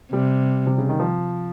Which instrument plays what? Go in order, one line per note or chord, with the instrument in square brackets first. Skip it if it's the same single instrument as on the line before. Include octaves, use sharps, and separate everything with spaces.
[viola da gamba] C3 [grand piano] G3
[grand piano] C3
C#3
D#3
F3